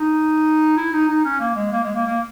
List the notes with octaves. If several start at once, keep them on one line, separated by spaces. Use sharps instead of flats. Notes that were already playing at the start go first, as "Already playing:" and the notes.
Already playing: D#4
E4
D#4
D#4
C#4
A#3
G#3
A#3
G#3
A#3
A#3